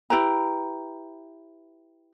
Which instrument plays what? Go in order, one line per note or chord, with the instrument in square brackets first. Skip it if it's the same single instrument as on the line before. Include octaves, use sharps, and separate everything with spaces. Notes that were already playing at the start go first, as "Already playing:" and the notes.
[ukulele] E4 G4 B4 A#5